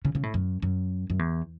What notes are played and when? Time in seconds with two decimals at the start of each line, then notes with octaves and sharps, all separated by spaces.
0.05 C#3
0.15 C#3
0.23 A2
0.34 F#2
0.62 F#2
1.10 F#2
1.19 E2